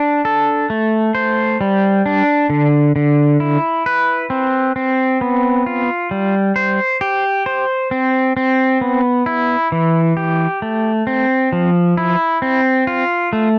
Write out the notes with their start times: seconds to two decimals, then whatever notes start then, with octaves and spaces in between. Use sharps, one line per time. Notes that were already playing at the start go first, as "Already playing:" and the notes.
Already playing: D4
0.25 A4
0.70 A3
1.15 C5
1.61 G3
2.06 D4
2.50 D3
2.96 D3
3.40 E4
3.86 B4
4.30 C4
4.76 C4
5.21 B3
5.66 F4
6.11 G3
6.56 C5
7.01 G4
7.46 C5
7.91 C4
8.37 C4
8.81 B3
9.26 E4
9.72 E3
10.17 G4
10.62 A3
11.07 C4
11.53 F3
11.97 E4
12.42 C4
12.87 F4
13.33 A3